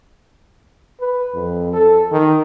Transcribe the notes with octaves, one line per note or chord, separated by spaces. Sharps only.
B4
F2
A4
D#3